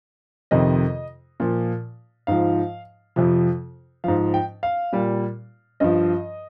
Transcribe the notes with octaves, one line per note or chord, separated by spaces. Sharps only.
F2 C3 D#3 D#5
A#2 F3
G#2 F3 F5
F2 C3 F3
G#2 F3 F5
G5
F5
A#2 G3
G2 F3 D#5